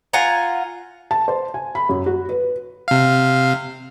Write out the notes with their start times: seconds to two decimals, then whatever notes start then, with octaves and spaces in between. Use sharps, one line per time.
0.13 F4 F#5 G#5 A#5
1.11 A5
1.28 C5
1.54 G#5
1.75 B5
1.89 F#2
2.06 F#4
2.29 B4
2.88 C3 F5